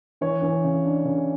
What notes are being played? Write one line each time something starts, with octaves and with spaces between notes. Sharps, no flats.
E3 C#5
E3
C#3
D4
C#3